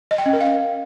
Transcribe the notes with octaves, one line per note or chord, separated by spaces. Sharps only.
D#5
G5
C#4
A#4
F5